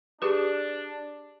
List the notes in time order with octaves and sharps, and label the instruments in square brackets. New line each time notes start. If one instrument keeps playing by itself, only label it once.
[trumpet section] D4 [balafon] G4 G#4 B4